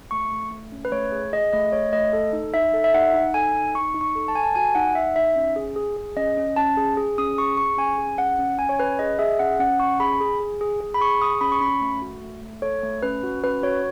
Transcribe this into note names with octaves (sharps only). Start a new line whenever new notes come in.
A3 C#6
A3
A3
C#4
B4
A3 C#5
G#4
G#4 D#5
A3 D#5
A3 C#5
A3 D#5
A4
D#4
D#4 E5
A4
E5
D#4 F#5
D#4
A4 G#5
D#4
D#4 C#6
D#4
C#6
A4
A5
A4 G#5
A5
F#4 G#5
D#4 F#5
D#4 E5
D#4 E5
C#4
G#4
G#4
G#4
C#4 D#5
C#4
C#4 A5
G#4
G#4
C#4 D#6
G#4 C#6
G#4 C#6
C#4 G#5
G#4
C#4 F#5
C#4
C#4 G#5
C#5
C#4 B4
G#4 D#5
G#4 E5
C#4 F#5
C#4 F#5
C#4 C#6
G#4 B5
G#4
G#4
G#4
G#4
B5
G#4 C#6
G#4 D#6
C#4 B5
C#6
C#4 B5
A3
F#4
A3
A3
A4 C#5
A3
C#4 B4
F#4
C#4 B4
F#4 C#5